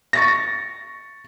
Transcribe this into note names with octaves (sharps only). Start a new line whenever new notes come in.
C#6 A6 A#6